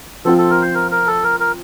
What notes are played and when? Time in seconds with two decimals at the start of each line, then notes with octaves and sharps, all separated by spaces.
0.25 F3 C4 F4 A4
0.38 A4
0.50 A#4
0.62 C5
0.74 A#4
0.91 A#4
1.07 A4
1.24 A#4
1.40 A#4